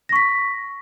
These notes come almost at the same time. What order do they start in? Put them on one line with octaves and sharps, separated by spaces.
A#6 C#6 B6